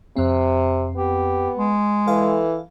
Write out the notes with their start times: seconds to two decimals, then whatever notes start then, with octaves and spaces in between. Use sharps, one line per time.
0.17 F2 C3 C4
0.96 B3 G4
1.56 G#3
2.08 E3 A4 F5